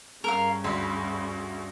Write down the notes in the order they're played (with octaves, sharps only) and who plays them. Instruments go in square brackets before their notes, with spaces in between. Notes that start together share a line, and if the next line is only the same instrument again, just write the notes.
[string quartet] G2 C#3 [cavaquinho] A#4 F5
[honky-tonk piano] D2 C6 [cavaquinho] B5